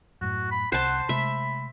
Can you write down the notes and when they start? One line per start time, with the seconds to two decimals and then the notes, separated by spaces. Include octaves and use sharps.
0.21 F#2 A2 F#4
0.52 B5
0.72 C2 C5 F#5 A5
1.09 C3 G#3 A3 E5 B5